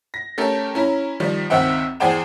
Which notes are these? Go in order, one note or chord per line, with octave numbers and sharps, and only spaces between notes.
A#6
A3 C#4 G4 A4 A#4
C#4 E4 A#5
D#3 F3 G3
C#2 D#3 C4 E5 F#5 G5
E2 G#4 C5 D5 G5 E7